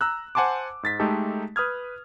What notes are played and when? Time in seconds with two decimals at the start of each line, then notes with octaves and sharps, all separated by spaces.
0.01 A#5 E6 F#6
0.35 C5 F#5 G#5 A5 C6 D6
0.83 G#2 A6 B6
1.00 G#3 A3 D#4 G4 A4
1.56 B4 D#6 F6 G#6